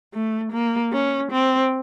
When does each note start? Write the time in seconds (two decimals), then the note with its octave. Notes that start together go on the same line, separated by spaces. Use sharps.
0.14 A3
0.53 A#3
0.92 C#4
1.32 C4